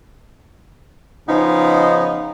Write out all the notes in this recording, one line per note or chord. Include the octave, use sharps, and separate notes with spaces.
C#3 F3 B3 D#4